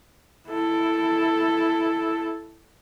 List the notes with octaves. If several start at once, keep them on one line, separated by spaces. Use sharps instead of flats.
E4 A4